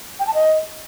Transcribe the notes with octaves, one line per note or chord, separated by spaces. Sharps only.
G5
A5
D#5